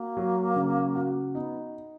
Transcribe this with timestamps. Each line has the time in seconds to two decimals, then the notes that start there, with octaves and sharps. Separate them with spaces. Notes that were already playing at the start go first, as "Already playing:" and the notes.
Already playing: A#3 F#4
0.17 F#3
0.56 C#3
0.95 F#4
1.34 B3 D#4